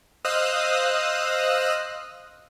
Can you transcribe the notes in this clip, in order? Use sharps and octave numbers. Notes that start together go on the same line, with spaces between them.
C5 D#5 F5 D#6 E6 F#6